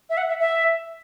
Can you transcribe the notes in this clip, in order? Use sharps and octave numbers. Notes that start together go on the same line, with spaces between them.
E5
F#5
E5
E5